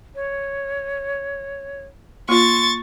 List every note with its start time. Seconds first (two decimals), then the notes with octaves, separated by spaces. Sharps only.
0.15 C#5
2.29 A#3 F4 C6 C#6 A6